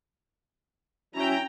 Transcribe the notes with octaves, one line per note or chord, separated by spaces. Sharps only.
F#3 C#4 E4 G5 A#5